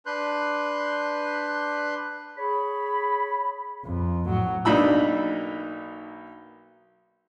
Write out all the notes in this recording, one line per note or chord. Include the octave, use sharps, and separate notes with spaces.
D4 B4 C6 F#6 G6
G#4 C#5 B5
F2
A2 F#3
B1 A#3 D4 D#4 B5 E6